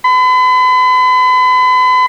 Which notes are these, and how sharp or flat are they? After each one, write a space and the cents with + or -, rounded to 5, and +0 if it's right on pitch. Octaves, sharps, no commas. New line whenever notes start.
B5 +40